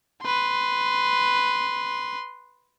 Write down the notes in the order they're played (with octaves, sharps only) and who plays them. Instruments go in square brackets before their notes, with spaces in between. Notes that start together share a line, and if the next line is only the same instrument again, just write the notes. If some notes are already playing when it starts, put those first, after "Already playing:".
[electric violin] B4 C6